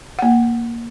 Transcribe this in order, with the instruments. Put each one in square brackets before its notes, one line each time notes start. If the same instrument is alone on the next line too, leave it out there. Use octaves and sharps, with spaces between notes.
[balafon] A#3 F#5